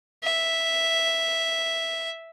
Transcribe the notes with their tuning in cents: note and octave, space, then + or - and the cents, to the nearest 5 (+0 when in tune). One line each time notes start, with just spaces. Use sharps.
E5 -5